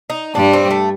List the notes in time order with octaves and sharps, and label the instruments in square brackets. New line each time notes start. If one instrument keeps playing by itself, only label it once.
[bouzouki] D#4
[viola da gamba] G2 G3 [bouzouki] D4
[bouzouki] C4
A3